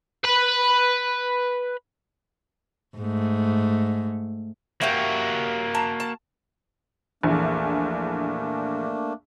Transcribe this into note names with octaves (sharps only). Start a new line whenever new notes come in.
B4 B5
G#2 A3
A#3 F#4 G4 C#5 E5
A5 A#5
A5
A#1 E2 A3 A#3 D4